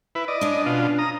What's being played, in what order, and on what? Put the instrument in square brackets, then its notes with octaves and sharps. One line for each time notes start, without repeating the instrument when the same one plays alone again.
[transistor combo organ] E4 B4
D5 D#5
[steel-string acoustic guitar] C#4 D4
[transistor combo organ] B2 F4
A#5 D#6